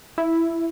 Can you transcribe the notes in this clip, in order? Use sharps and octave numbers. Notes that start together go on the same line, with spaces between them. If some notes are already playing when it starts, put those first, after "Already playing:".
E4